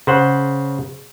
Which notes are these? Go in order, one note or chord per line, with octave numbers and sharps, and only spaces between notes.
C#3 C5 F#5